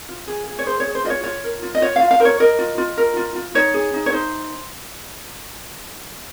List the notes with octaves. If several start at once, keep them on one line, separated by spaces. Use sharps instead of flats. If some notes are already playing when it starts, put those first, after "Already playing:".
F4
G#4
G#4
C#5
G#4 C5
C#5
G#4
C5
F4 D#5
C#5
F4 C#5
A#4
F4
D#5
F4 C#5
F4 F5
F5
A#4 C5
C#5
A#4 D#5
F4
F4
A#4
F4
F4
D#4 C#5
G#4
D#4
C#5
D#4 C5